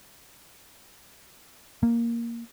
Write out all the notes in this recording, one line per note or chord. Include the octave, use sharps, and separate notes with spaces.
A#3